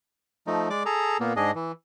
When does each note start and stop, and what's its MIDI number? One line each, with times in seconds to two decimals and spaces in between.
0.47 0.69 53
0.47 0.69 57
0.47 0.69 63
0.70 0.83 56
0.70 0.83 74
0.70 0.83 86
0.86 1.17 68
0.86 1.17 69
0.86 1.17 82
1.20 1.33 46
1.20 1.33 58
1.20 1.33 59
1.36 1.51 44
1.36 1.51 62
1.36 1.51 68
1.36 1.51 75
1.55 1.72 52